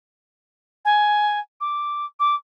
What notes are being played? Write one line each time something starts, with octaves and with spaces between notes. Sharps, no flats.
G#5
D6
D6